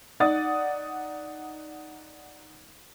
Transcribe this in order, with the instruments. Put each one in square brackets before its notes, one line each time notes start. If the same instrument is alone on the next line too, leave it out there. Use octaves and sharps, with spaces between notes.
[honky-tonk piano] D#4 D5 F#5 D#6 A6